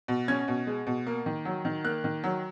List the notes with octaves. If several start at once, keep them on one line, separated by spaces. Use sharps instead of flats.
B2
C#4 G#6
B2
G#3
B2
A#3
D#3
F#3
D#3
A#3 F#6
D#3
F#3